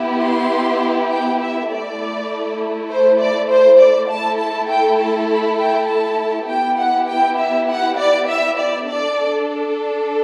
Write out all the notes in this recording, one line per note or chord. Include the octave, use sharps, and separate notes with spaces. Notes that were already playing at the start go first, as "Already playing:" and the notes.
Already playing: B3 E4 G4
C6
G5
E5
A3 E4 A4 D5
C5
D5
C5
D5
A3 E4 A4 A5
A5
G5
A5
B5
G5
A5
B3 E4 G4 G5
F#5
G5
E5
F#5
D5
E5
D5
D4 A4 D5